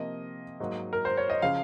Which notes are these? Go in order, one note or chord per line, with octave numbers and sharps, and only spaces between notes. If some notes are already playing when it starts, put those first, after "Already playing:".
Already playing: C3 F3 A#3 D#5
G#2 F#3 A#3
A#4
C5
C#5
D#5
C#3 F3 F5